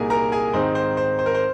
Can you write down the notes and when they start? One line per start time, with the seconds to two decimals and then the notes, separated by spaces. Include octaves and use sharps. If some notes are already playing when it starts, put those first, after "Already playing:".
Already playing: C2 A#2 A#3 D#4 G#4 A#4 G#5
0.10 A#4 A#5
0.32 G#4 G#5
0.53 G#2 D#3 C4 D#4 C5
0.75 C5
0.97 C5
1.19 C5
1.26 A#4
1.35 C5